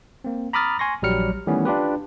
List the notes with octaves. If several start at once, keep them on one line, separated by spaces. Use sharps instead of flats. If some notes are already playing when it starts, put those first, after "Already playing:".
A#3 C4
A#5 B5 D6 D#6 F6 A6
G#5 C6 C#6 A#6
A#1 F#3 G3 F6 C#7
D#3 E3 G3 A3 B3 C#4
D4 F4 G4 B4